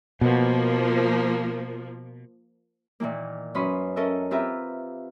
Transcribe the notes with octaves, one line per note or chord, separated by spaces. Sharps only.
B2 F3 A#3
A#2 D#3 E3 A#3
F#2 C#4 B4 B5 C6 D#6
C#4 A4 A#4 D#5 E5
C4 F4 G4 B4 E5 A#5